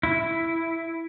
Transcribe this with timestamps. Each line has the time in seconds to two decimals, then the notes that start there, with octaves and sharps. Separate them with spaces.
0.03 E4